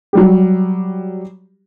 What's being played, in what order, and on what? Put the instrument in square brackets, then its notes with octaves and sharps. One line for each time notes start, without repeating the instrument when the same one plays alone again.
[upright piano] F#3 G3 G4